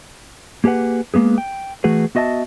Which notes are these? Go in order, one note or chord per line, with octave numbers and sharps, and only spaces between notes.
A#3 G4 G#4 B4 F#5
G#3 A#3 B3 G#4
G5
E3 A3 F#4 G#4 B4
B3 F#4 D#5 E5 A5